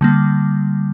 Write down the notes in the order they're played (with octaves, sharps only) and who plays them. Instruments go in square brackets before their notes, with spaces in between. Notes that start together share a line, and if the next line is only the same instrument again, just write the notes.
[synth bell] D3 G3 A#3